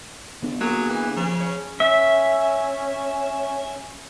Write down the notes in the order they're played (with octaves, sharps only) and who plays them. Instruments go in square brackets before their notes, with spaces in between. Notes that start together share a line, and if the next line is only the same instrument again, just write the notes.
[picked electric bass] D3 B3 D4
[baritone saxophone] F#3 [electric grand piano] A#3 G#4
[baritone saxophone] E3
[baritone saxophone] C#3 [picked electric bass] F3
[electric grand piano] C#5
[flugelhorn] C#4 [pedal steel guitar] E5